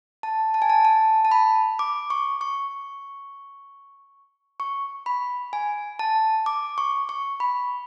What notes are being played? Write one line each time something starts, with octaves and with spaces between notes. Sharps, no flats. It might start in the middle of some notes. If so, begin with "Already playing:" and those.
A5
A5
G#5
A5
A5
A5
B5
D6
C#6
C#6
C#6
B5
G#5
A5
D6
C#6
C#6
B5